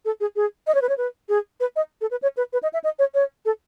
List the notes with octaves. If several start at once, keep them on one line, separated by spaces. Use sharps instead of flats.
A4
G#4
G#4
D#5
C#5
B4
C#5
B4
G#4
B4
D#5
A4
B4
C#5
B4
B4
D#5
E5
D#5
C#5
C#5
A4